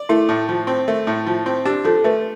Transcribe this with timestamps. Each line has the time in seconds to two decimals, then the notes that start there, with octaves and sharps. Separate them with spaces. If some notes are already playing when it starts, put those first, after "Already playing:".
Already playing: D5
0.09 A3 E4
0.29 A2
0.49 F3
0.67 C4
0.88 A3
1.07 A2
1.27 F3
1.46 C4
1.65 D4 G4
1.84 F3 A4
2.04 A3 B4